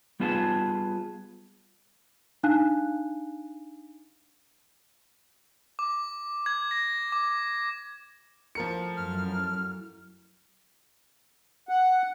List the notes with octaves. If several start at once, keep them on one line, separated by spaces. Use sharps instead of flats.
G3 B3 F4 G#4 A5
D4 D#4 F5 G#5 F#6
D6
G#6
A#6
D6
A2 F3 F#4 A#4 C#7
F#2 F6
F#5